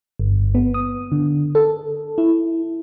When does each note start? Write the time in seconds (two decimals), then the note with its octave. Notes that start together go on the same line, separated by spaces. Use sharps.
0.19 G1
0.55 B3
0.74 D#6
1.12 D3
1.55 A4
2.18 E4